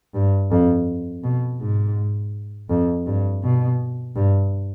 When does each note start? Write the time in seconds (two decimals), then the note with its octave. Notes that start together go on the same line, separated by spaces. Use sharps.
0.15 G2
0.51 F2
1.24 B2
1.61 G#2
2.70 F2
3.06 G2
3.44 B2
4.15 G2